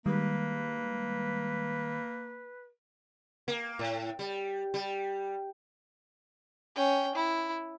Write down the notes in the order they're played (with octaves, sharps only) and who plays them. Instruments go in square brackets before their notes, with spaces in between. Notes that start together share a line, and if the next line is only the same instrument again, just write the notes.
[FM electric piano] D#3 G3 G#3 [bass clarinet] A#3 [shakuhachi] B4
[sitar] A#3
A2
G3
G3
[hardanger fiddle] C#4 G5
E4